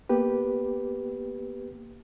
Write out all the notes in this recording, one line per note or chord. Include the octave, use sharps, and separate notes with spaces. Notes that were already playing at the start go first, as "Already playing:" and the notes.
A#3 B3 G4 B4